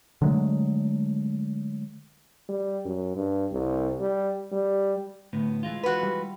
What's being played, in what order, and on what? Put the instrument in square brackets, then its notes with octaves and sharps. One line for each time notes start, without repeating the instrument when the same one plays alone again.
[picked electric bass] D3 F#3 G#3 A3
[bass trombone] G3
F#2
G2
C2
G3
G3
[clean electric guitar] D2 A2 B3
E3 G#3 F4
[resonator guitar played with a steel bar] F#4 B4
[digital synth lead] G3